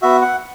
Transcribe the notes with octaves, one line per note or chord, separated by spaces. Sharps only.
B3 F#4 E5
F#5